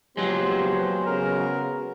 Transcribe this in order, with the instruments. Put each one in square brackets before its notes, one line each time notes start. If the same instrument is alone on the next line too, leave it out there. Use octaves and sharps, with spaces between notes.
[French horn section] C#3 F3 G4 [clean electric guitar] F#3 G#3 [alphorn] B3 [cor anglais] C5
[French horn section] C#3 F#4 [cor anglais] A#4